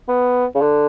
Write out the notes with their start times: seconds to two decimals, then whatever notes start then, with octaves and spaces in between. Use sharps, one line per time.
0.09 B3
0.55 C#3
0.61 D3